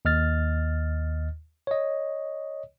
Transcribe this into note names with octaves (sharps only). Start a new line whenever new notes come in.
D#2 D#5 F6 A6
C#5 D#5